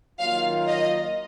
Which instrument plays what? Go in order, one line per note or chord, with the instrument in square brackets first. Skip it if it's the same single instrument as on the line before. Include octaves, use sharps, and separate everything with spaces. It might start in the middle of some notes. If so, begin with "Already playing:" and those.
[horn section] D#3 F#3 A#3 F4 [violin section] F5
[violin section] D#5